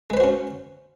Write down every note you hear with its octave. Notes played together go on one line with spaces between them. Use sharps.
G#3 C#4 F#4 B4 C5